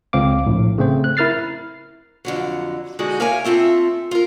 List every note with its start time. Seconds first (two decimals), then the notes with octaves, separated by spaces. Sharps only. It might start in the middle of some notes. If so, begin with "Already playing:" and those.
0.13 C#2 C4 F5 D6
0.47 A#1 A2
0.78 C#3 A3 C4 C5
1.04 F#6
1.17 E4 A#4 F6 A6 C7
2.25 F2 D3 F#3
2.99 D3 G#3 D#4 F#4 G#4
3.20 A#3 A#4 C#5 E5 G#5
3.45 A3 C4 F4 A4 E5
4.11 F4 A#4